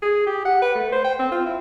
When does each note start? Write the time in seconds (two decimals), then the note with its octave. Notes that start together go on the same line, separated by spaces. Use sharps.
0.02 G#4
0.27 G4
0.45 F#5
0.62 B4
0.76 A3
0.92 C5
1.05 G5
1.19 C4
1.32 F4
1.46 E4